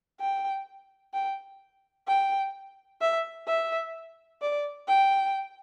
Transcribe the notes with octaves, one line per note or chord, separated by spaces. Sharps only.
G5
G5
G5
E5
E5
D5
G5